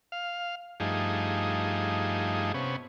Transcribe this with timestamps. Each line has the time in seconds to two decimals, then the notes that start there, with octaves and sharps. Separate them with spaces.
0.12 F5
0.80 G2 F3 A3 D#4 G#4
2.54 C3 B3 C#4